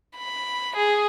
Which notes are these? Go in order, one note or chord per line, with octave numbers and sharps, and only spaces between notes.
B5
G#4